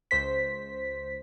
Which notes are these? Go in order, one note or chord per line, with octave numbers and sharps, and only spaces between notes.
C#2 C5 B6